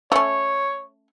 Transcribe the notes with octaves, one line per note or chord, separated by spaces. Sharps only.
A3 C#4 C#5